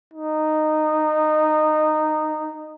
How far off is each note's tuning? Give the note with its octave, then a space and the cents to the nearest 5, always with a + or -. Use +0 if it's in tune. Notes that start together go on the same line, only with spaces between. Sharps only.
D#4 -15